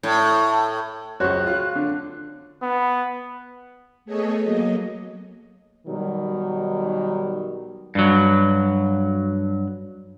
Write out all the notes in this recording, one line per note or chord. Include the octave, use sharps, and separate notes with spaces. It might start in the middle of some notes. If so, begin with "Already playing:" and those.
A2
C#2 F#2 F#4 C5 C#5 F#6
F4 F5
D3
B3
A3 B3 G#4 A4 C#5 D#5
F#3 A#3 D#5
B2 D#3 F#3 G3
G2 F#3